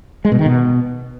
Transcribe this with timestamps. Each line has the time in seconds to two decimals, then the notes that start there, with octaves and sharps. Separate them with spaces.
0.25 G#3
0.32 B2
0.39 D#3
0.46 B2